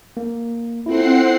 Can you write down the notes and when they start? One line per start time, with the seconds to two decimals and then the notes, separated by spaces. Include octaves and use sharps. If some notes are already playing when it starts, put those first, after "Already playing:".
0.17 A#3
0.86 C4 E4 F4 A4 F#5 C7